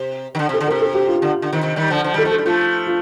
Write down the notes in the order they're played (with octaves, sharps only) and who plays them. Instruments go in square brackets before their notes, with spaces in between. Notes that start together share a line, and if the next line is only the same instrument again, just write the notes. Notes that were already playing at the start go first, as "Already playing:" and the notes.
Already playing: [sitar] C3
D#3
D3
[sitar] C3 [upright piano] A4
[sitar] D3
[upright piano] A#4
[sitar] C3
[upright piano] A4
G4
F4
[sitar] D3
D3
C3 D#3
C3 D#3
D#3 G3
D3 F3
D3 F3
[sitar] D#3 G3 [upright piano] A4
[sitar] F3 A3
[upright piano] A4
[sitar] G3
[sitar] F3 A3 [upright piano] F4
[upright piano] F4